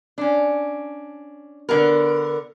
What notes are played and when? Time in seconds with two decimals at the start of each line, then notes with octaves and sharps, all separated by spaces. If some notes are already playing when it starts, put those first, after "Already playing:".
0.18 C#4 D4
1.69 D3 B3 A#4